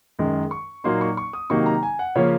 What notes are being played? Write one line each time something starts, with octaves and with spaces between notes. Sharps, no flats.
F#2 D#3 G#3
C#6
A#2 F#3 A#3 D#4 C6
C#6
C#6
D#6
C3 D#3 F#3 A#3 D#4 C#6
A#5
G#5
F#5
C#3 F3 A#3 C#4 C#5